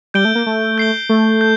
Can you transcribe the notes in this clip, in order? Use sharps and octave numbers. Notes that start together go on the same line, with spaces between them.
G3 G6 D7 G7
A3
A#3
A3
G6 C7 G7
A3
G6